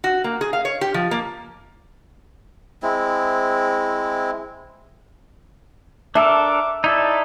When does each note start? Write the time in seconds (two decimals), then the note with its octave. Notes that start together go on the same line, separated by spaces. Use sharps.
0.04 F#4
0.24 A#3
0.41 G#4
0.53 F5
0.65 C#5
0.81 G4
0.94 F3
1.11 A#3
2.82 G#3 C4 E4
6.15 D4 A4 A#4 E5 D6
6.84 D#4 E4 A4 D5